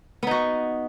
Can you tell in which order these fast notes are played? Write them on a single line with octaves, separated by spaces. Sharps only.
B3 D#4 F#4